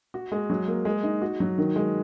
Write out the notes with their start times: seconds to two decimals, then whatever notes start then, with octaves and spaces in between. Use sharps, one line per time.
0.14 F#4
0.32 G#3
0.50 F#3
0.67 A#3
0.85 G#3
1.03 D#4
1.22 F#4
1.40 F#3
1.58 D#3
1.76 G#3